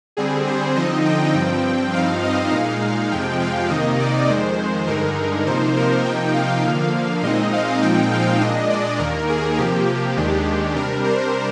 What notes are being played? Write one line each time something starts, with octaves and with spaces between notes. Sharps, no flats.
D3 G3 C4 G#4
C5
D3 F3 C4 D#4 D#5
G5
G2 F3 C4
G2 F3 C4 D#4 F5
D#5
A#2 G#3 D#4 F5
F2 C3 F3 G#3 G5
F5
C3 D#3 A#3 D#4 D#5
D5
F2 D#3 G#3 C5
G2 D3 G#3 D#4 A#4
C3 F3 A#3 D#4 C5
A#4
C3 F3 A#3 D#4 G5
F5
D3 F3 A#3
A#2 G#3 C4 D#4 D#5
F5
A#2 F3 G#3 C4 D#4 G5
F5
A#2 G#3 D4 D#5
D5
D#2 D#3 A#3 A#4
G#4
C3 F3 A#3 G4
G4
D#2 D#3 G#3 D4
C3 G3 D4 A#4
C5